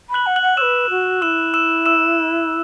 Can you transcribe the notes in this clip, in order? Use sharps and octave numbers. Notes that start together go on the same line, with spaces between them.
B5
F#6 F#7
F#5
F#6 F#7
F#5
B4 C#5 E6 E7
F#4
E4 E6 E7
E6 E7
E6 E7